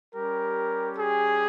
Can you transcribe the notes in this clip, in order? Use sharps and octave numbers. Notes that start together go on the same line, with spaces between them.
G3 C#4 G4 A#4
G#4